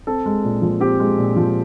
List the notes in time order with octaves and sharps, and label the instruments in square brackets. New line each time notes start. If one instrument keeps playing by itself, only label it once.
[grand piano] C4 A4
G#3
A#2
F3
C4 G4
G#3
A#2
F3